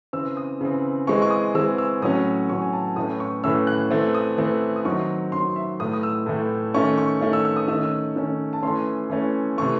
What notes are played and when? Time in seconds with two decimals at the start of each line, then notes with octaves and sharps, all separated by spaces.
0.13 C#3 E3 C4 E6
0.37 D#6
0.61 C#3 E3 C4
1.07 E3 G#3 C4 C#6
1.22 C#6
1.30 D#6
1.55 E3 G#3 C4 E6
1.78 E6
2.02 A2 F#3 C#4 D#6
2.49 A2 F#3 C#4 C#6
2.62 G#5
2.73 A5
2.96 A2 E3 A3 C#4 D#6
3.20 C#6
3.44 A2 E3 A3 C#4 E6
3.67 F#6
3.91 E3 A3 C4
4.15 D#6
4.38 E3 A3 C4
4.76 D#6
4.85 D#3 F#3 C4 C#6
5.32 D#3 F#3 C4 C6
5.56 E5
5.80 A2 E3 A3 D#6
5.93 D#6
6.03 E6
6.26 A2 E3 A3
6.74 D#3 A3 C#4 C#6
6.98 C#6
7.21 D#3 A3 C#4
7.33 E6
7.45 E6
7.56 D#6
7.68 D#3 A3 C#4 E6
7.84 E6
8.16 D#3 A3 C#4
8.53 A5
8.62 E3 A3 C#4 C6
9.10 E3 A3 C#4
9.58 C3 E3 A3 C#6